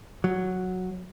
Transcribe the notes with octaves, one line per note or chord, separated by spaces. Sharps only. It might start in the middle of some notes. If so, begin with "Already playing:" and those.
F#3